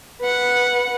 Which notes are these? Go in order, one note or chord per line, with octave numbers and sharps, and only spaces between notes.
B4 F#5